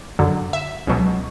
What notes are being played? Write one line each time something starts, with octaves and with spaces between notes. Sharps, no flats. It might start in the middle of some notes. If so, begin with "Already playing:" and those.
Already playing: D5
F#2 D3 F#3
E5
C#2 B2 F#3